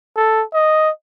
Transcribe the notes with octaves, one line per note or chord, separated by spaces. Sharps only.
A4
D#5